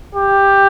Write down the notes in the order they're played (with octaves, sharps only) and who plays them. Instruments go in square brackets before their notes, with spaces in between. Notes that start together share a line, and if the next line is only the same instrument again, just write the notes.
[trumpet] G4